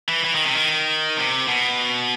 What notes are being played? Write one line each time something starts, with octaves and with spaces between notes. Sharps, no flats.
E3
E3
D#3
C3
D#3
C3
B2